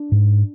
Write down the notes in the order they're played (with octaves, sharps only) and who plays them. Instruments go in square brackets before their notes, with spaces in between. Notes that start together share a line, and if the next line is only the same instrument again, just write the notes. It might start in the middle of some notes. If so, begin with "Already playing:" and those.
Already playing: [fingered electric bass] D4
G#2